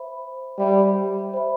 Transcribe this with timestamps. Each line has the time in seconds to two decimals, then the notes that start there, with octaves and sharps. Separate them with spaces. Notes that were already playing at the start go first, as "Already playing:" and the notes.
Already playing: C5 E5 B5
0.58 G3 C5 E5 B5
1.34 C5 E5 B5